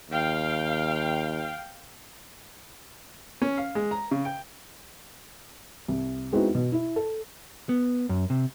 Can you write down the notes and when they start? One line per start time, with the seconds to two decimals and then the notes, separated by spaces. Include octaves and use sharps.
0.10 D#2 F5 G5
3.42 C#4
3.58 F5
3.75 G#3
3.91 A#5
4.11 C#3
4.25 G5
5.88 C2
6.33 G#3 B3 C4 D#4 E4 F#4
6.55 B2
6.72 E4
6.96 A4
7.69 B3
8.09 F#2
8.30 C3